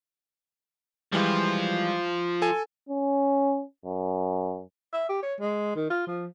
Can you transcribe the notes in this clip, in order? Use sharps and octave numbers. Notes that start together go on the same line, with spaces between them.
E3 F3 G3 G#3 F4
A4 G#5
C#4
F#2
E5
G4
C#5
G#3
D#3
F4
F3